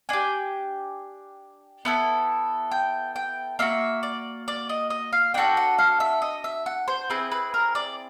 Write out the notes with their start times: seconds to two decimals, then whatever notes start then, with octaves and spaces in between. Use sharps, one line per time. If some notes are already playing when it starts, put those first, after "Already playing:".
0.09 D4 G4 G#5
1.85 B3 E4 A4
2.71 G5
3.16 G5
3.59 A#3 D4 F#4 E5
4.03 D5
4.48 D5
4.69 D#5
4.90 D#5
5.13 F5
5.34 D4 F#4 A4 G5
5.57 F#5
5.78 F5
6.00 E5
6.22 D#5
6.44 E5
6.66 F#5
6.88 C5
7.10 C4 E4 G#4 B4
7.31 B4
7.54 A#4
7.75 D5